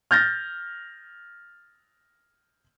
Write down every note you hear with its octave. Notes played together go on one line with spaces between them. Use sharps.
F6 G6 A6 A#6